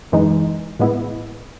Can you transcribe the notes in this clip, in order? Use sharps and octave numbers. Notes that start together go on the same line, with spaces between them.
F#2 E3 G#3 D#4
A2 G#3 B3 E4